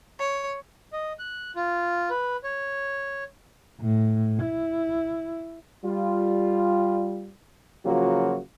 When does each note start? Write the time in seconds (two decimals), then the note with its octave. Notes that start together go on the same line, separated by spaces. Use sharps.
0.18 C#5
0.93 D#5
1.19 F#6
1.56 F4
2.10 B4
2.44 C#5
3.80 A2
4.43 E4
5.83 G3 F4
7.85 C#3 F3 F#3 A#3 F4 F#4